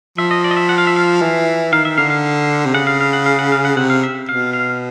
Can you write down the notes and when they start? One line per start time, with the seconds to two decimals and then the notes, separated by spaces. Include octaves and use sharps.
0.18 F3 E5
0.31 D#5
0.44 D5
0.51 D#5
0.57 E5
0.69 F#5
0.78 F5
0.87 E5
0.96 F5
1.22 E3
1.72 D#3 F5
1.85 E5
1.98 D3 F5
2.10 F5
2.65 C3
2.74 C#3 F#5
2.87 F5
3.01 F5
3.13 F#5
3.26 F5
3.39 F#5
3.52 F5
3.65 F#5
3.77 C3 F#5
3.90 F5
4.03 E5
4.29 B2 F5
4.53 F5